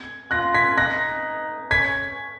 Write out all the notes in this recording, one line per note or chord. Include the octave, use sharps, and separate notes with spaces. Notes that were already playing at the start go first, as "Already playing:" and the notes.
Already playing: G#6
F4 F#6 A#6
G#6 B6
D#4 F#6 A#6
C#4 G#6 B6